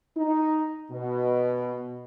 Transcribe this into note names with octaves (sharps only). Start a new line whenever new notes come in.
D#4
B2